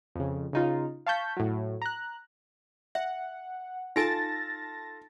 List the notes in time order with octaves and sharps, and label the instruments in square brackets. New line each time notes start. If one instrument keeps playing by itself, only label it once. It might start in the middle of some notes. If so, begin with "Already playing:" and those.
[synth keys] F2 C#3
C#3 D#4 F4
F5 A5 C#6 G6 B6
A2 F#3
A#5 F#6
[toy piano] E5 [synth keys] F#5
[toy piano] D#4 G#5 [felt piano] F4 A4 [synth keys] A5 A6 A#6